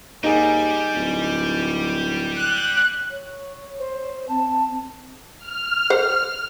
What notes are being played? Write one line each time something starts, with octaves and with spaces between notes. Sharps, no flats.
D#2 G3 D#4 G#4
D1
F#6
C#5
C5
C4 A5
F6
C5 F#5